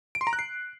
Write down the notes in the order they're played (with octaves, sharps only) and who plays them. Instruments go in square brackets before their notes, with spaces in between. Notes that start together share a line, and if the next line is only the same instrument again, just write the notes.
[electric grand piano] D7
C6
A#5
F#6
C7